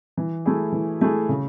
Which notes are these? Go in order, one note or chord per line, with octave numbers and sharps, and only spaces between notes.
E3
A3 E4 G#4
E3
A3 E4 G#4
C#3